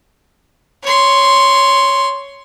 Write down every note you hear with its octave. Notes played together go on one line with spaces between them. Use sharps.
C#5 C6